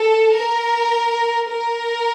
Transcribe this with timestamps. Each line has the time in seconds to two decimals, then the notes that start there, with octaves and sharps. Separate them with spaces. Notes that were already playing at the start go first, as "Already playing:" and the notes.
Already playing: A4
0.35 A#4
1.49 A#4